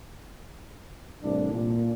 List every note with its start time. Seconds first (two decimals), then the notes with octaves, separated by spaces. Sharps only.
1.22 C2 A2 E3 D4
1.52 A#2